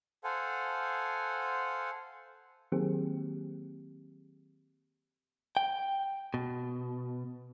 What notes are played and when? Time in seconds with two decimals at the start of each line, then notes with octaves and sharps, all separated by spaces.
0.24 A4 C5 F5 F#5 G#5
2.72 D#3 F#3 A#3 C4 G4 G#4
5.57 G5
6.34 B2